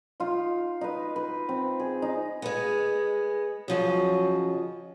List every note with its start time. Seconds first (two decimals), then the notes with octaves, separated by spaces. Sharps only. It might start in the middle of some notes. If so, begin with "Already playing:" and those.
0.20 D#4 F4
0.81 D#4 B4
1.16 B4
1.49 C4
1.80 G#4
2.02 D#4
2.42 G#3 B3
3.68 C#3 F3 F#3 D#5